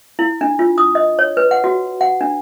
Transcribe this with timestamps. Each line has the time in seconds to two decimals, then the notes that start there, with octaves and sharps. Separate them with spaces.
0.19 E4
0.41 D4
0.59 F4
0.78 D#6
0.95 D#5
1.19 C#5
1.37 B4
1.51 F#5
1.64 F#4
2.01 F#5
2.21 D4